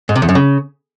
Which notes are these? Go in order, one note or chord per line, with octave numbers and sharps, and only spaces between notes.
G#2
C3
E2
F#2
C#3